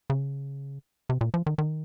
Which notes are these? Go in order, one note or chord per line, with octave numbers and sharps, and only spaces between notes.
C#3
C3
A#2
F3
D#3
D#3